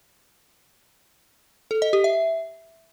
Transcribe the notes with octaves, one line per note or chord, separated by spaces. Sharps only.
A4
D#5
G4
E5